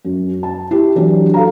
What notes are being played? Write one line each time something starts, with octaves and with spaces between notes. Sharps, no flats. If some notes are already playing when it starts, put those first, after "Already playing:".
F#2
A5
E4 G4
E3 F#3 D4 G4
A4 F5 A#5